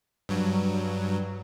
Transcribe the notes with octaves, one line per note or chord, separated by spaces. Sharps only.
G2 F#3